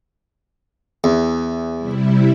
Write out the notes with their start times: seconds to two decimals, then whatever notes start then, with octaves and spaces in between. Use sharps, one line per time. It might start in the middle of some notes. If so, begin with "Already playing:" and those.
1.04 E2
1.77 C3 G3 E4